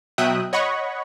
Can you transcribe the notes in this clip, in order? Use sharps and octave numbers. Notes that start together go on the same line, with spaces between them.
B2 F#3 E5 G5 D#6 F#6
C#5 D#5 F#5 B5 C#6